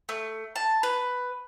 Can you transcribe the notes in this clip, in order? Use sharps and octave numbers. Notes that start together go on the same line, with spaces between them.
A3
A5
B4